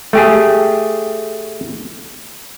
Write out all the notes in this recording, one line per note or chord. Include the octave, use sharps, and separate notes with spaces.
A3 G4 G#4